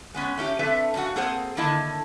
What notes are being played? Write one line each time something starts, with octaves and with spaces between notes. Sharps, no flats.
G#3 B3 C#4
A3 C#4 D#4 G4
A3 C4 D4 A4 B4 E5
F#2 C#3 F3 F#4 F#5
A#3 C4 G#4 A4 C5 F#5
D3 D#3 A#3 E4 D#5 A5